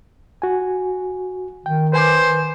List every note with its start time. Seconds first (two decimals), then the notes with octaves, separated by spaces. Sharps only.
0.42 F#4 G#5
1.66 D#3 G5
1.93 B4 C5 G#5 D6